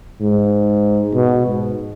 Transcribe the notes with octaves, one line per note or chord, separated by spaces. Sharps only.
G#2
B2
G#2